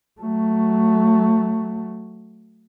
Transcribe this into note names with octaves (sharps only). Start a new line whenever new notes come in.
F#3 A3